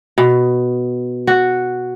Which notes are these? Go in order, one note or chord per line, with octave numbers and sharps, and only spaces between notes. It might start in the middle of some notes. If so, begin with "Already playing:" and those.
B2
F#4